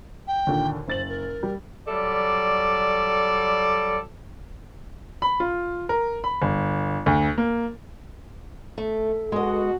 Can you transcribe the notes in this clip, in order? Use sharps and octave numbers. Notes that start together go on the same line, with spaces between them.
G5
D#2 A#2 D3
F#1 C5 A6 F#7
A#4
G3
F#3 G3 A4 D5
B5
F4
A#4
B5
G1
D2
A#3
A3 A4
B2 G#3 F#4 D#5